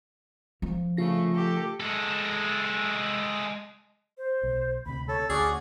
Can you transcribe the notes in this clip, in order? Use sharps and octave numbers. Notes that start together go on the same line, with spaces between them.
F3
C#3 A3 F4 A#6
G4 A4
G#3 A4
C5
B1
D2 C3 B5
A4 C#5
D2 C#4 F#4 G#4 D5 F#5